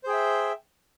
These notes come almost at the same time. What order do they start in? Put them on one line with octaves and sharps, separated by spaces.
C5 G#4 G5 E5